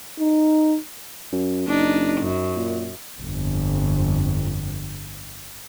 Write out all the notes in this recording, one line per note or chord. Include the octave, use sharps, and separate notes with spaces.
D#4
F#2
F#1 D4 D#4
F#2
A#2
G1 F2